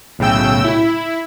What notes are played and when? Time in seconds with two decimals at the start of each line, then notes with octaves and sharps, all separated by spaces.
0.19 B1 A2 C#3 G5 E6
0.64 E4